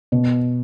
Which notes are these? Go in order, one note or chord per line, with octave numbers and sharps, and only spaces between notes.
B2